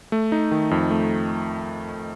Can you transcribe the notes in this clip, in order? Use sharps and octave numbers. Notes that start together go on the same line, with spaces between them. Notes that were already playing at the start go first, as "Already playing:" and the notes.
A3
D#4
D#3
F2
A3